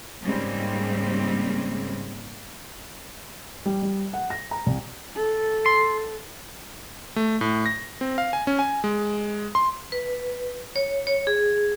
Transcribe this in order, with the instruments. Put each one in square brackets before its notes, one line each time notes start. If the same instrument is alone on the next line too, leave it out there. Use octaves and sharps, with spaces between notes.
[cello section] G#2 C#3 G3 G#3 A#3 C4
[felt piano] G3
G3
F#5
A#6
A#5
C2
[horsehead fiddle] A4
[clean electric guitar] C6
[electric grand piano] A3
A2
A#6
C4
F5
G#5
C#4
G#5
G#3
C6
[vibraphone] B4
C#5
C#5
G#4